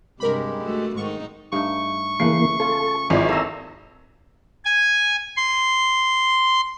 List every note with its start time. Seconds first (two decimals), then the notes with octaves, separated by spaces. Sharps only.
0.20 G2 C3 G#3 G4 A#4 B5
0.64 A3 F#4
0.97 G#2 D#3 D#4 C#6
1.52 G2 A3 D#4 C#6
2.20 C#3 E3 A3 A#3 B4 C7
2.60 C#4 F4 A4
3.10 G#1 E3 G#3 F4 D5 D#5
3.29 A#3 A4 D#5 A#5 E6
4.65 G#5
5.37 C6